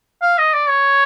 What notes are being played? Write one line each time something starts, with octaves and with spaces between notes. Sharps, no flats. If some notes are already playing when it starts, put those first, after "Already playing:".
F5
D#5
D5
C#5